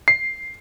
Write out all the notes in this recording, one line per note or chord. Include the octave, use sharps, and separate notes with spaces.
C7